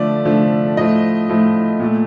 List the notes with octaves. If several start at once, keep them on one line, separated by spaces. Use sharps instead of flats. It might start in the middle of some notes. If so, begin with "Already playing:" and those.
Already playing: D3 F3 A3 D5
D3 F3 A3
A2 F3 A3 D#5
A2 F3 A3
A#2 A3